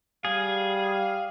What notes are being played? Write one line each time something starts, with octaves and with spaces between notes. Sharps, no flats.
G3 G#4 F5